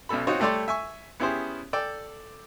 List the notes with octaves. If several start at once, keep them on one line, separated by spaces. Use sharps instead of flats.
B1 B2 C#4 A4 B5
C4 D#4 F4 F#4 C#5
G3 A3 A4 C#5 D5 C6
E5 G#5 C#6
B3 C#4 E4 G4 G#4 C5
A4 D5 G5